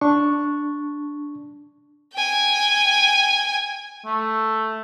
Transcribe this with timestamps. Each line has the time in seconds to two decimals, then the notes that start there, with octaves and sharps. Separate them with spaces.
0.01 D4 C#6
2.14 G5 G#5
4.06 A3